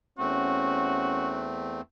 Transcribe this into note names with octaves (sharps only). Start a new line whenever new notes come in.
E2 A3 C4 C#4 F#4